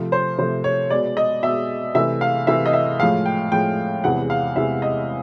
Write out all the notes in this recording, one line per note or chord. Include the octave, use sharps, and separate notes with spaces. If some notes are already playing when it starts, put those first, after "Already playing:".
Already playing: C3 F3 A3
C5
C3 F3 A3 C5
C#5
B2 G#3 D5
D#5
B2 G#3 E5
C3 E3 A3 E5
F5
C3 E3 A3 E5
D#5
E5
A2 F3 G#3 F5
G5
A2 F3 G#3 G5
E2 C3 E3 G#3 F#5
F5
E2 C3 E3 G#3 E5
D#5